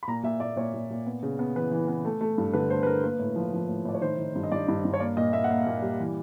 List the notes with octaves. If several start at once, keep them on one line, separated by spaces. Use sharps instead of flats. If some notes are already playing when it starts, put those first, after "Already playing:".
B5
A#2 A#5
A#2 E5
A#2 D5
A#2 C#5
A#2
A#2
B3
C#3
B3
E3 B4
E3
B3
A3
A3
G2
D3 B4
A3 C5
B4
A3 A#4
A#3 B4
A2
F3
F3
A2
A2 D5
C#5
D#3 C5
D#3
G2
D#5
G2 D5
G2
G2
C#5
A#3 D5
A#2 D#5
A#3 E5
F#5
A#3 F5
A#2
G3
E3